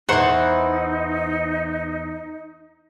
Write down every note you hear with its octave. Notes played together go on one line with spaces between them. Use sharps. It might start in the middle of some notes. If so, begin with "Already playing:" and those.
E2 E3 D#4 C5 F#5 A#5 C#6